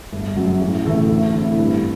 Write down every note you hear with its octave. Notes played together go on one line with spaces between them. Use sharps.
G1
F#2 F#3
A1
A2 E3 A3
D2
D3 A3 C4 E4
G2